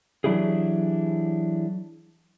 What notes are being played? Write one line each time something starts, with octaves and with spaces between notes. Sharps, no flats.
E3 F#3 D4 E4 G4 G#4